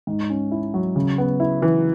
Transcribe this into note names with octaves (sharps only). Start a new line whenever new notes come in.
G#2
C#4
E4
F#3
C#3
B3
E4
E3